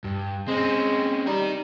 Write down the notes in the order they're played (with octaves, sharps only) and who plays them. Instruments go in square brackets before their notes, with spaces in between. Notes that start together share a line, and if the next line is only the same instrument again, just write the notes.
[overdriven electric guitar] G2
[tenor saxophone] G#3 [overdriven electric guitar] C4 C#4
[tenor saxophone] G3 [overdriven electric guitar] D#4 A#4